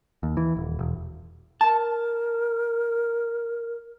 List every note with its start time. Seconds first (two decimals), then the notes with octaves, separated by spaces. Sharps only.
0.23 D#2
0.37 E3
0.57 D#1
0.79 E1
1.61 A#4 A5